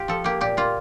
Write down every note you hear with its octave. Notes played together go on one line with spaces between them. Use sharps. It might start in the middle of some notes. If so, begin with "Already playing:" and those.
Already playing: F4 G4
F3 A4
A#3 G4
A#2 G4
A#3 F4